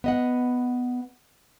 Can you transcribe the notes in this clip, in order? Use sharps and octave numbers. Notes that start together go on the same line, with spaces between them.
B3 D#5 F#5